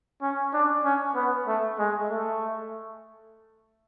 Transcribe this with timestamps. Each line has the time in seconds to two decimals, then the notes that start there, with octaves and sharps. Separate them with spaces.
0.22 C#4
0.53 D4
0.84 C#4
1.15 B3
1.47 A3
1.79 G#3
2.10 A3